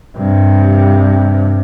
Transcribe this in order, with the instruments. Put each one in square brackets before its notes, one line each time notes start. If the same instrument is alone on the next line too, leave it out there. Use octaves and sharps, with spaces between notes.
[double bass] G2 C3